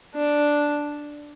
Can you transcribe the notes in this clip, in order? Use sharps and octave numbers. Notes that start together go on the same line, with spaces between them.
D4